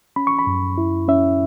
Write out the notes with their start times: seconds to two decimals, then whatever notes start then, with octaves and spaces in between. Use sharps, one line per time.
0.16 C#4 B5
0.27 C#6
0.39 B5
0.47 F#2
0.78 E4
1.08 C#4 E5